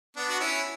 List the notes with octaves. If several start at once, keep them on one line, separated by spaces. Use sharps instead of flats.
B3 D4
F#4
C#4 E4